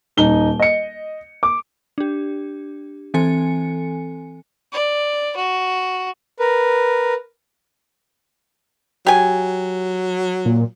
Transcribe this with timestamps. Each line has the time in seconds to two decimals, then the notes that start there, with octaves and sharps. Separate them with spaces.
0.17 D#1 D#4 G7
0.60 D#5 C#7
1.43 D6
1.98 D4 G4
3.14 E3 C4 A4 G#5 C#7
4.73 D5
5.36 F#4
6.39 A#4 B4
9.07 F#3 G4 G#5
10.46 A#2